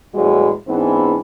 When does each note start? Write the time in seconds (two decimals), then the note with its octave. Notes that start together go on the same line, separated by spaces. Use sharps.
0.14 E2 A2 G3 G#3 F#4 B4
0.67 G#2 E3 G#3 B3 C4 D4